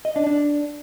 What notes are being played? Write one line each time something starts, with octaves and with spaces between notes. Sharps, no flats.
D#5
D4
D4